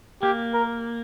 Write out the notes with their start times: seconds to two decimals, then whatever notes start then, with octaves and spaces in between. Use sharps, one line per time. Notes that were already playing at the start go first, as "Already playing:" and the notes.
0.22 A#3 G4
0.54 A#4